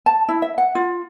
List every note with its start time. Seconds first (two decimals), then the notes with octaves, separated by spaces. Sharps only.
0.06 A5
0.28 E4
0.42 E5
0.58 F#5
0.75 F4